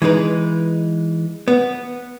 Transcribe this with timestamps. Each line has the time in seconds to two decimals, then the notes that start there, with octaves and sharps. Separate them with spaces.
0.02 E3 G#3 D#4 B4
1.48 B3